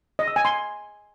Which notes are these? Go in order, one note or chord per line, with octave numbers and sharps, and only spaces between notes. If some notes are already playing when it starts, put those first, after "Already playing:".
D#5
E6
G#5
C6